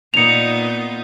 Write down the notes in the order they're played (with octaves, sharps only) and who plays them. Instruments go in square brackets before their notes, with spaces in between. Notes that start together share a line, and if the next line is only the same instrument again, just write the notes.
[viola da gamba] A#2 B3 D#4 [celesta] C#7 F7